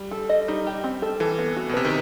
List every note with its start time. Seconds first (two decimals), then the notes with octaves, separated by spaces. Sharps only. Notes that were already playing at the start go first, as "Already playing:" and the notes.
Already playing: G3
0.11 A4
0.29 D#5
0.48 G3 D#4
0.67 G4
0.84 C4
1.02 A4
1.20 E3 A4
1.39 B3
1.56 F#4
1.69 B2
1.74 C3 B4
1.85 D#3